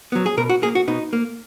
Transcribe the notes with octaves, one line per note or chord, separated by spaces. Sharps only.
F#3 B3
G#4
B2 A#4
F#4
A#3 G#4
F#4
B2 D#4
A#3